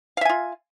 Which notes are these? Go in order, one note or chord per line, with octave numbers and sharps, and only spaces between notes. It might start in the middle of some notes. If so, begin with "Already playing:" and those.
F4 E5 F5 G#5